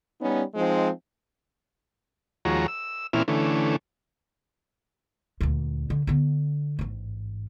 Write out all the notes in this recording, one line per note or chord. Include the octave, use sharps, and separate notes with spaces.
G3 B3 C#4 D#4
F3 G#3 C4 D#4
D#2 F3 G#3 F#4 C#5 A#5
E6
A#2 E3 C4 C#4 E4 F6
D3 E3 A3 C#4
D2 A#2
D3
D3 B3
A1 G#2